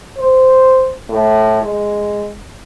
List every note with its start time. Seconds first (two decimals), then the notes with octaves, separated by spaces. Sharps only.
0.17 C5
1.09 A2
1.62 G#3